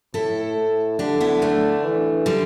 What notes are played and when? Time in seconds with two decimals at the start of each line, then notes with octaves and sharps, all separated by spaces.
0.14 A2 E4 A4
0.57 A2
0.99 D3 D4 G4
1.20 B3 E4
1.42 A3 D4
1.84 E3
2.26 D3 G3